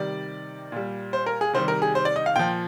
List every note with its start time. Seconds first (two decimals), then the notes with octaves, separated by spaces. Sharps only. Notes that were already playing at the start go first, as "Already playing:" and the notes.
Already playing: C3 D#3 G3 D5
0.72 A#2 G3
1.13 C5
1.26 A#4
1.41 G#4
1.53 C3 D#3 G3 C5
1.68 A#4
1.82 G#4
1.95 C5
2.05 D5
2.16 D#5
2.26 F5
2.36 A#2 F3 G5